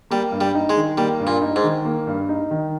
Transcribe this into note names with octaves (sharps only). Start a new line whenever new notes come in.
G3 A#3
G2
G3
D#4
G#3
D#3
G3 A#3
G2
A#2
D#4
G#2
D#3
A#3
G2
D#4
D#3